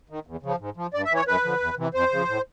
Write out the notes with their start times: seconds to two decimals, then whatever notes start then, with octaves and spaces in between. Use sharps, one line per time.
0.10 D#3
0.26 E2
0.43 C#3 F3
0.60 G#2
0.77 F3
0.94 G2 D5
1.05 E5
1.11 E3 C#5
1.27 F#2 B4
1.44 D3 F3
1.60 E2
1.77 C3 E3
1.94 F2 C5
2.12 C#3 F3
2.28 A2